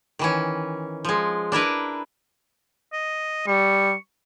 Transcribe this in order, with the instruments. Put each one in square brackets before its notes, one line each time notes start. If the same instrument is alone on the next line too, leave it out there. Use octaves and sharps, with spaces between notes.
[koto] D#3 E3 C#4
F3 G#3
D4 E4 A#4 B4
[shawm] D#5
[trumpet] G3 [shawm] C#6